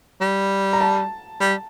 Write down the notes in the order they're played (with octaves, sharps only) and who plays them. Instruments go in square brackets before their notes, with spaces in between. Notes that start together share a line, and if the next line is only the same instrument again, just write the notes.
[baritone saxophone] G3
[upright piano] A#5
A5
[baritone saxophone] G3